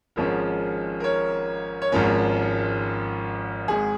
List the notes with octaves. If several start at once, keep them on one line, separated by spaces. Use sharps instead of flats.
G#1 G#2 F3 G#3 C#4 A#4
A#4
C#5
C#5
G#1 G#2 F3 C#4 A#4
G#1 G#2 G#3 G#4